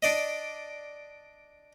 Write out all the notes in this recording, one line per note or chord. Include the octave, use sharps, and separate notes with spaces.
D4 D5 D#5